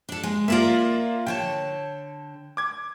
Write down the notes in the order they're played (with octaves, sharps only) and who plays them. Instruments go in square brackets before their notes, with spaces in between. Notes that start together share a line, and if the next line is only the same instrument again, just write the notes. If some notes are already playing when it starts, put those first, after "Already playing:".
[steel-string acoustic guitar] D4 A4
G#3
[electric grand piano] A#3 F4 [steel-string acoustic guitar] A#4 D5 E5
[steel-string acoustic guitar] D3 C#5 A5 [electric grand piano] G5
[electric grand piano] D6 G#6